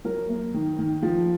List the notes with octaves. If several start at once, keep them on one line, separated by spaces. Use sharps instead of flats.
F#3 A#4
A#3
D#3
D#3
F3